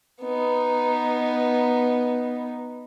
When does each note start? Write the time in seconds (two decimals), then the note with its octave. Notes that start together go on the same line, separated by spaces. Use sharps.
0.22 B3 D#4